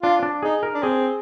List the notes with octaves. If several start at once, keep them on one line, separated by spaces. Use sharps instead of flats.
D4 F4
D4
D#4 G#4
A#4
D4
C4 G#4